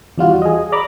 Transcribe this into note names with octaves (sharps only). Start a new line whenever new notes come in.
E2 G3 F4 F#4
G#4 D#5
D5 A#5 B5 D6